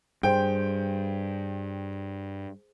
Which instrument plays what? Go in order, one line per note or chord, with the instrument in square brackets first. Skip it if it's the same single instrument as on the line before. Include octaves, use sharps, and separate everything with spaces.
[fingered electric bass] G2 [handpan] G#4 C5 [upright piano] G5